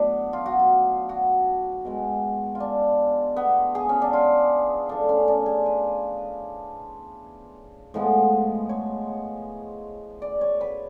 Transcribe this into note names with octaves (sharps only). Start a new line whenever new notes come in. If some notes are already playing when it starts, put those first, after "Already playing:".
Already playing: A2 F#3 B3 D4
F4
F#4
F4
F#4
B2 G#3 B3
F4
D4
B3
G#4
C#4
D4
F4
A2 F3 A3 D4
C#4
D4
G#4
B4
A2 F3 G#3 B3
C#5
D5
C#5
B4